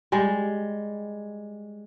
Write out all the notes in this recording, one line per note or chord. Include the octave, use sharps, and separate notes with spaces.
G3 G#3